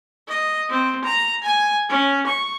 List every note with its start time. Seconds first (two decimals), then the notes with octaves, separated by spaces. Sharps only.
0.28 D#5
0.70 C4
1.05 A#5
1.44 G#5
1.89 C#4
2.27 C#6